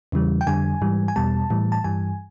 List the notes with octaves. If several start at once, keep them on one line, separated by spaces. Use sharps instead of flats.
E2 C#3 E3 G3
G5
F2 D3 G3 G#5
G#2 E3 G3
G#5
E2 B2 G3 A5
A2 E3 G3
A5
G2 E3 G3 G#5